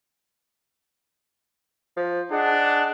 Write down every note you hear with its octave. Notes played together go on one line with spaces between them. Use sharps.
F3
D4 G#4 D#5 F#5